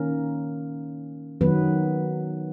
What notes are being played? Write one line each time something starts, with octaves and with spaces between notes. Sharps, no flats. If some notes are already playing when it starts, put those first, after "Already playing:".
Already playing: D#3 A#3 C#4 A#4
D#3 F#3 B3 B4